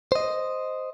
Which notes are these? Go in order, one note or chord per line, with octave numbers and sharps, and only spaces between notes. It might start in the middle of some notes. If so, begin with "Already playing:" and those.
C5 D#5